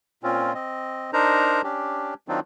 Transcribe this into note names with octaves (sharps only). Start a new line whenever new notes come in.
A#2 C4 C#4 F4
C4 D#5
D4 D#4 A#4 C5 A#5
C#4 D4 G4
D#3 F#3 C4 D4 D#4 F4